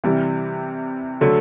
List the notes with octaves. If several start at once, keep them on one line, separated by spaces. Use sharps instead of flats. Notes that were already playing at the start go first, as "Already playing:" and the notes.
C3 E3 G3
D3 F#3 A3